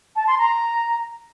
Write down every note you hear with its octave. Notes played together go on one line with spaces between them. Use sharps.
A5
C6
A#5